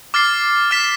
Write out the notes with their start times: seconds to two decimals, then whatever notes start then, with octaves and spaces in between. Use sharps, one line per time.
0.14 D6 F6 A6 C7
0.71 D6 F6 B6 E7